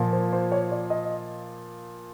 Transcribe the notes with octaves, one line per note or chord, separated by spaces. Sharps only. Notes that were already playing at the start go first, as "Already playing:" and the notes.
Already playing: A#2 F3 A#3
C5
C5
C#5
D5
D#5